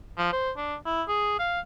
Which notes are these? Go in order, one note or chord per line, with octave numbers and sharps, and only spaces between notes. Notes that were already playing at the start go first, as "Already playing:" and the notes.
F3
C5
D4
E4
G#4
F5